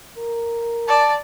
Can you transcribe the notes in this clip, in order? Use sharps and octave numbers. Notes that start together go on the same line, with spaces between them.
A#4
D5 A5